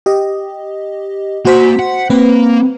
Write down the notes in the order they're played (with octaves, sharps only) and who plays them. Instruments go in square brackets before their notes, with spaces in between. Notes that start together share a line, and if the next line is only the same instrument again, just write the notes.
[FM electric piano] G4 D#5
[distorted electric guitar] A#3 G#5 [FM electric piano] F#4 C5 B6
[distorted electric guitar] F#5
[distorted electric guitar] A#3 [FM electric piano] C4 B4